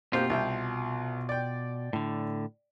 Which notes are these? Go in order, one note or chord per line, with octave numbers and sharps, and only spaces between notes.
B2 A#3 C4 F4 G4
C2 E5 G5
D5 G5
A2 D3